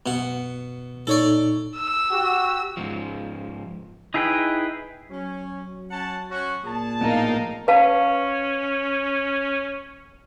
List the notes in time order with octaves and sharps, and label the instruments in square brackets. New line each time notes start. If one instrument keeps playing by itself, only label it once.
[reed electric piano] F#2 [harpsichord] B2 F#5
[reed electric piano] A#2 D#4 [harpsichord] A4 C#5 D5
[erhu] E6
[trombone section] F#4 G4
[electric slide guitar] G#2 F3
[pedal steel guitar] D#4 E4 G#4 B4 G5
[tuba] F#3 [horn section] C#4
[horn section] C#4 F#5 A5
C#4 F#4
[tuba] A#2 [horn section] G#4 A5
[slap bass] A#1 A2 B3 [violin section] D#4 A#4 F5
[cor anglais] C#4 [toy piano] B4 F5 A5